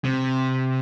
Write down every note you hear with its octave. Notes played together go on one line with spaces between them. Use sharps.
C3